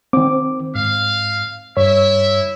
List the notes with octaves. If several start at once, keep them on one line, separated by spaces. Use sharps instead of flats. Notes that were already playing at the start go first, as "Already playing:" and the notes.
D#3 C4 D6
G#2 F5
G2 E4 C#5 E5